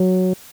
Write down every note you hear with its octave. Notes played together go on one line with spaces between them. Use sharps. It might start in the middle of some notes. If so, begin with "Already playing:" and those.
Already playing: F#3